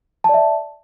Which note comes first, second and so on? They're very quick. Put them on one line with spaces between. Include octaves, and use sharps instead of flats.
A5 D5 E5